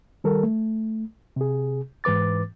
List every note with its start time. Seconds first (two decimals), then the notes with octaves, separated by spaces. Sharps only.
0.24 D#3 G3 A4 A#4
0.43 A3
1.36 C3 G#4
2.04 G#2 E3 B4 D6 A6